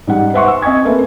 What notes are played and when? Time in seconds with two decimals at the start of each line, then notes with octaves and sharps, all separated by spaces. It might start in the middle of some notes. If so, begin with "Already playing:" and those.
0.07 G#2 G3 F#5
0.34 B4 C5 E5 F#5 C6 C#6
0.48 E6
0.62 C4 D#5 G#5 C#6 G#6
0.84 A3 A#3 C4 A4 B4 E5